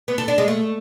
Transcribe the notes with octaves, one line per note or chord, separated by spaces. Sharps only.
B3
A4
D4
G#3
A3